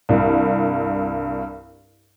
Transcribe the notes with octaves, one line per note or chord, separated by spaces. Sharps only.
C2 G2